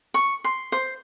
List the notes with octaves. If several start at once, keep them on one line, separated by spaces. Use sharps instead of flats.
C#6
C6
C5